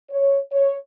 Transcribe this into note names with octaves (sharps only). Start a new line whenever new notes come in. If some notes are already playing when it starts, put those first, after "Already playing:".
C#5
C#5